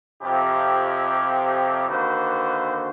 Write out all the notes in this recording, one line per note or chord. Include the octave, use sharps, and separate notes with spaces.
F2 C3 G4
D3 D#3 A#3 F#4 B4 C5